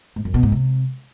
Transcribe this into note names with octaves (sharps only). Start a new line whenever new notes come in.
G#2
F#2
B2
G#2
C3